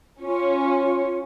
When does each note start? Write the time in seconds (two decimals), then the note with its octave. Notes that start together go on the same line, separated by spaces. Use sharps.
0.20 C#4 F4